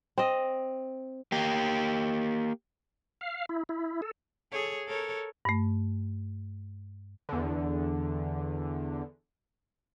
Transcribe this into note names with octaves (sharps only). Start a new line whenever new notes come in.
C4 D#5
A#3 G4
F5
E4
E4
A4
G#4 A4 C#5
A4 A#4 C#5
G2 A3
E2 D3